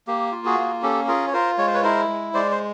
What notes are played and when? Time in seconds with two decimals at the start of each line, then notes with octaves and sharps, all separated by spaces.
0.07 A#3 G4
0.32 F4
0.45 F#4 G#4
0.58 A#3
0.82 C#4 G4 A4
1.08 F4 G#4 A#4
1.27 C#5
1.33 F4 A#4 C5
1.58 G#3 C#5
1.67 C5
1.74 B4 C#5
1.83 E4 A#4 C5
2.08 G#3
2.34 G#3 C5 D5
2.52 C5